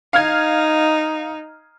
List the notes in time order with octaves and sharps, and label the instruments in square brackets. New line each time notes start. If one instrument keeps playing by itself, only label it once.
[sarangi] D#4 [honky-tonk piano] F5 F6 G#6